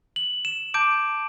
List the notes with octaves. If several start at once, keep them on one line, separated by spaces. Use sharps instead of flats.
F#7
E7
A5 D6 G6 D7